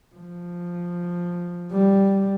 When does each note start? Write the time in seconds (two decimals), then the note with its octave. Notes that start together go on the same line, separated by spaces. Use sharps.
0.15 F3
1.73 G3